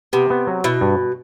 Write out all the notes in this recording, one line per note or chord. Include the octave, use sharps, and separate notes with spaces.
C3 B3
B3
F#3
B2 E4
G2